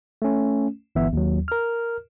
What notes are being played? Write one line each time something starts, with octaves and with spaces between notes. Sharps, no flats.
A3 C#4
G1 E3 B3 E5
D#2 F#3
A#4 F6